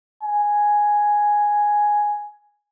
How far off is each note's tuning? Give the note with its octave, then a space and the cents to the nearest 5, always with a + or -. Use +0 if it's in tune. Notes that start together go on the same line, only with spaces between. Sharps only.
G#5 +0